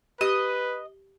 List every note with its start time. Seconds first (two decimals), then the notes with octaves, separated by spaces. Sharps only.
0.21 G4 B4 D#5